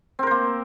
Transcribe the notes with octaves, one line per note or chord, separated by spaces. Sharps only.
A#3 C4 A#4 C5